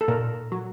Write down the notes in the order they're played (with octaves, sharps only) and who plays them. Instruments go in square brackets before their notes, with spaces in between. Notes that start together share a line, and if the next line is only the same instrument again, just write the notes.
[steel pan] A4
[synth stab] A#2 [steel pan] A#4
[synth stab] F#3